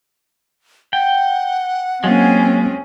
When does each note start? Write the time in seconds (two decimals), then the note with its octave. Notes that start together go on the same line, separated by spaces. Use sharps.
0.93 F#5 G5
2.04 F#3 G#3 A#3 C4 C#4 F4 G#4